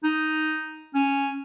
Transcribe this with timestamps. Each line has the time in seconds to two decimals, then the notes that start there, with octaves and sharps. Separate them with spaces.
0.04 D#4
0.95 C#4